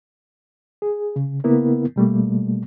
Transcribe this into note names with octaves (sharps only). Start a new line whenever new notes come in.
G#4
C#3
C#3 A#3 B3 E4 A#4
B2 G3 A3 A#3